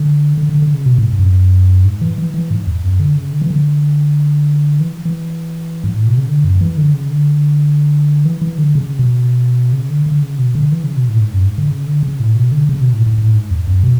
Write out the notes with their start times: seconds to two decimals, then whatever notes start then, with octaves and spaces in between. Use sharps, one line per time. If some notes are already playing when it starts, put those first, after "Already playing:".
Already playing: D3
0.37 D3
0.49 D3
0.62 D3
0.74 C#3
0.86 B2
0.98 A2
1.03 G#2
1.13 G#2
1.19 F#2
1.85 G#2
2.02 E3
2.18 E3
2.34 E3
2.51 G#2
2.67 E2
2.83 F#2
3.00 D3
3.17 C#3
3.33 D3
3.42 E3
3.50 D3
4.80 E3
5.05 E3
5.84 G#2
5.95 A2
6.07 B2
6.18 C#3
6.29 D3
6.44 F#2
6.61 E3
6.77 D3
6.94 C#3
7.10 D3
8.25 E3
8.42 E3
8.58 D3
8.75 C#3
8.99 B2
9.73 C#3
9.90 D3
10.06 D3
10.22 C#3
10.39 B2
10.55 D3
10.72 E3
10.84 C#3
10.97 B2
11.08 A2
11.21 G#2
11.33 F#2
11.45 G#2
11.58 D3
11.70 C#3
11.87 D3
12.03 C#3
12.20 A2
12.36 B2
12.52 D3
12.69 C#3
12.81 B2
12.93 A2
13.06 A2
13.18 A2
13.35 G#2
13.51 E2
13.67 F#2
13.83 B2